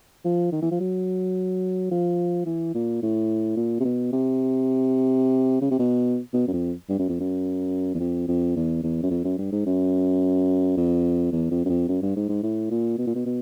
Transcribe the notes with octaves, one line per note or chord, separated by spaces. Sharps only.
F3
D#3
E3
F3
F#3
F3
E3
A#2
A2
A#2
C3
B2
C3
C#3
C3
B2
B2
F#2
F2
G2
F#2
F2
F#2
E2
F2
F2
E2
E2
F#2
F2
F#2
G2
G#2
F#2
F2
E2
F2
F#2
F2
F#2
G2
G#2
G#2
A2
A#2
B2
A#2
B2
B2